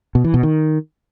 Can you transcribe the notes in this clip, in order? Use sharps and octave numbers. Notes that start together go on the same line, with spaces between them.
B2
E3
B2
D#3